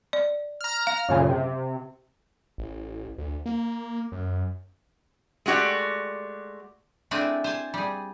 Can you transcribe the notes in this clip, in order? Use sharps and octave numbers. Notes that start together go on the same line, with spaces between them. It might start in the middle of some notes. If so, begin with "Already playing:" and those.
D5
A#5 F6
F5
F#2 A#2 C#3
C3
A1
D2
A#3
F#2
G#3 A3 F#4 G4 D5
A3 C4 D4 E4 G#4 B4
C5 G#5 A5
G3 G#4